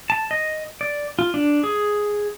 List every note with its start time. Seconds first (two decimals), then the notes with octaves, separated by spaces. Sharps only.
0.10 A5
0.31 D#5
0.81 D5
1.19 F4
1.34 D4
1.63 G#4